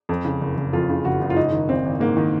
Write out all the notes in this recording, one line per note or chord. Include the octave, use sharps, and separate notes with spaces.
F2
C#3
F#1
F#1
F2 F4
C#3
F#1 F#4
F#1
F4
G#2 D#4
D#3
G#1 C4
G#1
G#2 A#3
D#3